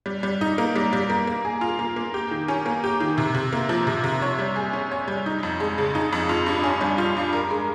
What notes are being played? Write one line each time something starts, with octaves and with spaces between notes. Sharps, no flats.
G3
G3
D#4
A#3
G3
G3
A#3
A#3
G#4
F4
A#3
A#3
G4
D#3
C#4
A#3
G4
D#3
C3
C3
A#3
F3
C3
C3
C#5
G3
G#4
C#4
C#5
G3
D#4
F2
G#3
C#3
D#4
F2
F4
G2
C#4
G3
F4
G2
A#4
G#3